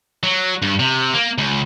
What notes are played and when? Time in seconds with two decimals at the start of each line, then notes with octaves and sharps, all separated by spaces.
0.23 F#3
0.62 G2
0.79 C3
1.14 A#3
1.38 C#2